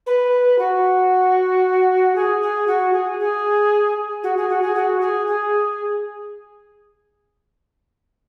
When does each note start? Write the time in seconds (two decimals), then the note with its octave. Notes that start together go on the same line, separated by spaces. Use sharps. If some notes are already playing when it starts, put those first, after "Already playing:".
0.06 B4
0.58 F#4
2.15 G#4
2.41 G#4
2.67 F#4
2.93 G#4
3.19 G#4
4.23 F#4
4.36 G#4
4.49 F#4
4.62 G#4
4.75 F#4
5.00 G#4
5.27 G#4